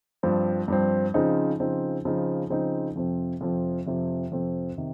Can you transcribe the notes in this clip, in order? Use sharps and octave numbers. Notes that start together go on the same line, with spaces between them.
G2 F3 C4
G2 F3 C4
C#3 F3 C4 D#4
C#3 F3 C4 D#4
C#3 F3 C4 D#4
C#3 F3 C4 D#4
F2 C3 F3 C4
F2 C3 F3 C4
F2 C3 F3 C4
F2 C3 F3 C4
C3 D#3